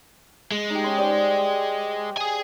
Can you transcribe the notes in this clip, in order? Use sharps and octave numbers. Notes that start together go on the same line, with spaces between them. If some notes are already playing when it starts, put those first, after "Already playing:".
G#3
D#4 G4
C#4 C6
G4 C5 D5
G#4 G#5